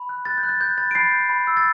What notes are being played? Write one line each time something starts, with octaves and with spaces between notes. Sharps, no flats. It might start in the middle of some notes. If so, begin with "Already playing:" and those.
Already playing: B5
F#6
F#6 A6
G6
F#6
A6
F#6 G6
B5 A6
D7
B5 A6 C7
G6
B5
E6
A6